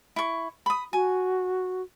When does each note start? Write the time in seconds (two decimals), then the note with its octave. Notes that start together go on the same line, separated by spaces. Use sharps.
0.16 E4 C#6
0.66 B5 D#6
0.93 F#4 G#5